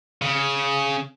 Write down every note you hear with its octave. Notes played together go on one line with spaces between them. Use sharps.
C#3